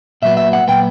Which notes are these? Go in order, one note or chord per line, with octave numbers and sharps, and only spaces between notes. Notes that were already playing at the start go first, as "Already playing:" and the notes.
A#2 F#3 B3 E5
E5
F#5
A#2 F#3 B3 G5